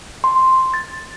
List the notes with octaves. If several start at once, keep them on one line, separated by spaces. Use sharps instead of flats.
C6
A6